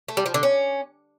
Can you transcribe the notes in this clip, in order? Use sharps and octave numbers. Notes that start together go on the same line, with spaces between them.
A3
G3
F3
D3
C#4